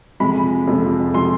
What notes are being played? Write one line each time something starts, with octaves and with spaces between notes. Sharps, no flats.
F2 C3 F3 G#3 B5
F2 C3 F3 G#3
C3 F3 G#3 C6